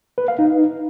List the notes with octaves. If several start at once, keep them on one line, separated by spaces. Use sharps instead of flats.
B4
F5
D#4